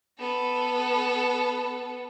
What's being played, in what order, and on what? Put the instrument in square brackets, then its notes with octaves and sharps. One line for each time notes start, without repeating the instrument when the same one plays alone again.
[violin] B3 A4